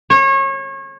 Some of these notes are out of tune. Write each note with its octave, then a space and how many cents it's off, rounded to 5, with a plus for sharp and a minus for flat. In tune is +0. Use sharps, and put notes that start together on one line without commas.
C#5 -30